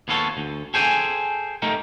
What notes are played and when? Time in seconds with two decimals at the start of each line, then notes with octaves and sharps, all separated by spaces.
0.08 D#2 B3 F4 A4 C#5
0.37 D2
0.74 G#4 A4 C5 G5 G#5
1.62 A3 D#4 G4 A#4